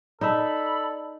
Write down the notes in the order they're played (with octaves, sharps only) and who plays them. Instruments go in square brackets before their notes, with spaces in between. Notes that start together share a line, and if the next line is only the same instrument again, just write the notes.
[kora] D#4 E5 [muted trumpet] A4 [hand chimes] D5 A5 E6 [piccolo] B5